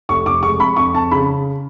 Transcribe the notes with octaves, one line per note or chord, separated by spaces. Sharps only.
F1 C#6
F1 D6
G#3 C#6
F2 B5
F2 C#6
F2 A5
C#3 B5